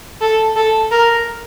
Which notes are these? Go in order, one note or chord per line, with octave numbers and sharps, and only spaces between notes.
A4
A4
A#4